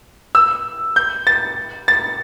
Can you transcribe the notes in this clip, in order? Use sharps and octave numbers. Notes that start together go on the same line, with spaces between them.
E6
G6
A6
A6